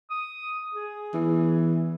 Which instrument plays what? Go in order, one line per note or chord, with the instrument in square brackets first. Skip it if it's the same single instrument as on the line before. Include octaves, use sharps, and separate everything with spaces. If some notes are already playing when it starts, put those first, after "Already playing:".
[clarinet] D#6
G#4
[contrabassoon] E2 [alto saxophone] E3